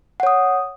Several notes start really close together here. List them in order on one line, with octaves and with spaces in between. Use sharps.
F#5 C#5 D#6